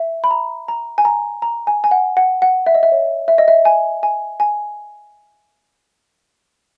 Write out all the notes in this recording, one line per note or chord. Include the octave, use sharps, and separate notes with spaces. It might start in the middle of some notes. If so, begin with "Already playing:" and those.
Already playing: E5
B5
A#5
A#5
G#5
A#5
A#5
G#5
G#5
F#5
F#5
F#5
E5
D#5
E5
C#5
E5
D#5
E5
G#5
G#5
G#5